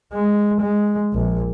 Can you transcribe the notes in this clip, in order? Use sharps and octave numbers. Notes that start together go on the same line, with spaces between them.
G#3
G#3
A#1